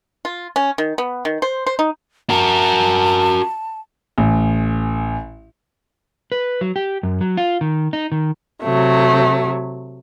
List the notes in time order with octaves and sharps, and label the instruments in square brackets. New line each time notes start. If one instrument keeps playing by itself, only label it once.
[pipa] F4
C#4
D#3
B3
D#3
C5
C5
D#4
[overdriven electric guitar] F#4 A#4 [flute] A5
[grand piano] A1
[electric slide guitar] B4
F#3
G4
F#2
F#3
F4
D#3
D#4
D#3
[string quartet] C3 F#3 A3